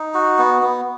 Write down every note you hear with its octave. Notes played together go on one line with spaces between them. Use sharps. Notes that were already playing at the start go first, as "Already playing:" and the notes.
Already playing: D#4
F#4
B3
B3